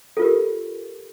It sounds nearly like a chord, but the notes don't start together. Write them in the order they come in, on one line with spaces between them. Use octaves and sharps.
A4 F4 A#4 G4